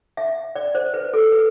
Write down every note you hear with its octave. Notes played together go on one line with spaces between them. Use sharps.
E5
D5
C5
B4
A4
B4